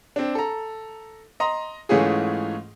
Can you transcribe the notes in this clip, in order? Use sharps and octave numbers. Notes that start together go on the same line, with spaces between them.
C4 D4
A4 A#5
D#5 A#5 C6
G#2 E3 A3 C#4 F4 G#4